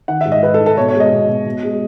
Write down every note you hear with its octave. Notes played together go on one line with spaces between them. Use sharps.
D#3 F#5
E5
G#2
D#5
G#2 B4
A4
G#2
A4
B2 C#5
C#5
G#3
D#5
B2
B2
B2
G#3